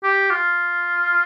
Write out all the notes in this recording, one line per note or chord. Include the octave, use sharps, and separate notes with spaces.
G4
F4